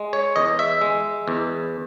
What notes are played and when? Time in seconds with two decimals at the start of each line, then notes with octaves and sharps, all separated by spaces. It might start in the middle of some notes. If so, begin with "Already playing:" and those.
Already playing: G#3
0.13 C#5
0.36 E2 D#5
0.59 E5
0.81 G#3
1.28 E2